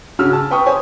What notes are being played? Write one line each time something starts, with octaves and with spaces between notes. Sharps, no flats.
C#3 C#4 F#4 E6 F6
A5
B4 G5 C#6 D#6
C5 C#5 G#5